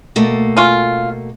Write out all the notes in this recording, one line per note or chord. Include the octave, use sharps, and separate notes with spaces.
B2 A3 A#3
C#4 F4